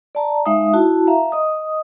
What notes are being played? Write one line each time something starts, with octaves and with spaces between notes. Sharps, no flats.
D5 A5 A#5
G#3 D#4 E5 F5 D#6
E4 F#4 A5
E5 F5 A#5
D#5 D#6